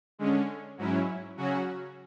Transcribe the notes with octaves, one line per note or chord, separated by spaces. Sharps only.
D3 G#3 C#4
G#2 F#3 C#4 E4
C#3 F#3 C#4 F#4